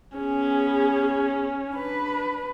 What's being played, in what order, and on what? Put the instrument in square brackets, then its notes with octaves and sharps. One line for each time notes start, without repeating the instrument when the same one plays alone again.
[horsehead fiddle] B3 G#4 [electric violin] C#4
[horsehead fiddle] D4 B4